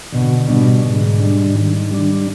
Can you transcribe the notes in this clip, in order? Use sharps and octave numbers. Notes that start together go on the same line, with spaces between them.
B2 D3
B2 G3 D4
G#2 D3
G3 D4
D#3
G3 D4